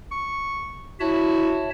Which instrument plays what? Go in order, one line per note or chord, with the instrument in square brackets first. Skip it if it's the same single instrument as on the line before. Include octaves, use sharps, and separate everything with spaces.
[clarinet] C#6
[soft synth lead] E4 [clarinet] F#4 [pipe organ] C#5 E5 A5